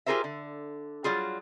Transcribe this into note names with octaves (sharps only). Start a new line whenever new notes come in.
F4 G4 G#4 A#4 C5 E5
D3
F#3 G3 F4 G#4